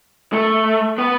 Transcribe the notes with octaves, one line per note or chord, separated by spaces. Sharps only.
A3
B3